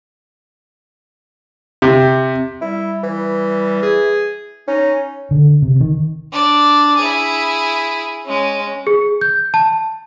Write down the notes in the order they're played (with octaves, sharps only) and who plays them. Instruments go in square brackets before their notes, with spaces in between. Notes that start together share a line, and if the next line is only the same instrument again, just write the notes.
[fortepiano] C3
[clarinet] G3 [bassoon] E4
[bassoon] E3
[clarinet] G#4
[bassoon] C#4 [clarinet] D#4
[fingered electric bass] D3
C3
D#3
[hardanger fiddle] D4 D5
E4 G#4
G#3 C#4
[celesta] G#4
G6
A5